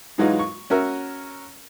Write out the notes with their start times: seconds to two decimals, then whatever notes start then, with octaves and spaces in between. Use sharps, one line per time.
0.18 G#2 E3 F#3 G#3 D#4 F4
0.39 C#6
0.70 C#4 F#4 A#4 E5